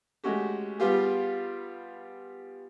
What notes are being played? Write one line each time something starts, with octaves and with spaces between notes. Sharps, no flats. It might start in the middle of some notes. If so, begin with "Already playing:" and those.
G#3 A3 C#4 F#4 G4
G3 B3 F4 G4 G#4